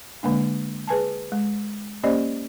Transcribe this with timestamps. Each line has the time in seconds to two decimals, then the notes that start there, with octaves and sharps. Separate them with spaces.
0.23 D3 G#3 A#3 D4
0.88 G#4 B4 G#5 A5
1.32 G#3
2.03 A#3 C#4 G4 C5 D5 D#5